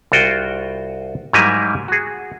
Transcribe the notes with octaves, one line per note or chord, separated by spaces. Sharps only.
C2 F4 F#4 G5
G#2 F#3 G3 A#3 E4 G#5
F#4 G#4